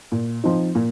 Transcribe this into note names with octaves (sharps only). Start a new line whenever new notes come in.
A#2
F3 C4 D#4
A#2